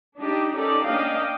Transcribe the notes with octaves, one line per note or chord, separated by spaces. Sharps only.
D4 D#4 G4 D#5
C#4 D#4 G4 A4 A#4 D5
A#3 C#4 D4 D#5 F5 G5